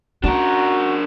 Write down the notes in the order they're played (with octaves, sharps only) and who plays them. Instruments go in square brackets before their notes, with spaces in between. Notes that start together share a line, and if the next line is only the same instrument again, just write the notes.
[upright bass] C#4 [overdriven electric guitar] D4 A#4 [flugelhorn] F#4